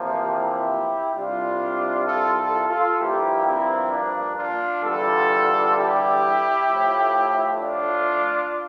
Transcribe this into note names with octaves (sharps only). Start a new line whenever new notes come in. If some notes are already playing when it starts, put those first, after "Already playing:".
Already playing: E2 C3 F3 A#3
E4 G4
C2 C3 G3 D4 F4
F4 A4
F4 A4
F4 A4
G2 F3 A#3 E4 G4
C4 E4
D4
D4 F4
E2 D3 G3 F4 A4
E4 G4
A2 F3 A3
D4 F4